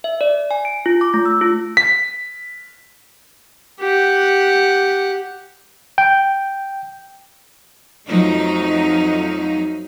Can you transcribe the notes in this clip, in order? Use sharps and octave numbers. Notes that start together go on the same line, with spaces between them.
E5
D5
G#5
D7
F4
D6
A3
E6
F4
B6
G4 F#5
G5
F2 F3 F#3 A3 D#4